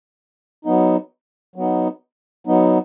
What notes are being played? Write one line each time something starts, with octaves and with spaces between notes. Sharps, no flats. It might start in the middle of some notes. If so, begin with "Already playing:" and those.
F#3 B3 D#4
F#3 B3 D#4
F#3 B3 D#4